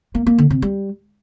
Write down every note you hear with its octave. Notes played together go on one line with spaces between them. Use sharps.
A#3
A#3
D3
C3
G3